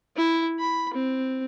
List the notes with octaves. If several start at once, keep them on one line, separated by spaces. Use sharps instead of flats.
E4
B5
C4